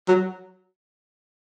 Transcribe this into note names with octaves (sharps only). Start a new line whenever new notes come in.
F#3